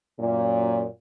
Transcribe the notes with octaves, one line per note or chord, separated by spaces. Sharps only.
F#2 A#2